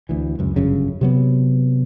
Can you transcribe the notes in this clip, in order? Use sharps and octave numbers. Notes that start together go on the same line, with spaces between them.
D2 E3
C#2 F#2
G1 F#2 C#3
C3 F#3 B3